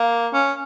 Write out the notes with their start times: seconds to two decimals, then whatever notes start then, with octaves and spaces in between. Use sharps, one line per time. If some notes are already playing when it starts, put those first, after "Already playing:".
Already playing: A#3
0.34 C#4